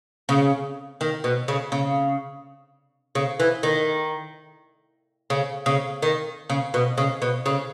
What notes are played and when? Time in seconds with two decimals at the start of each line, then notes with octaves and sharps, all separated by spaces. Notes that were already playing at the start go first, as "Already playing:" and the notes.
0.29 C#3
1.01 D#3
1.24 B2
1.48 C#3
1.72 C#3
3.15 C#3
3.40 E3
3.63 D#3
5.30 C#3
5.66 C#3
6.02 D#3
6.50 C#3
6.74 B2
6.98 C#3
7.22 B2
7.46 C#3